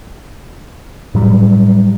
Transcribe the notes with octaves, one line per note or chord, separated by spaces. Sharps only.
A2 F#3 G3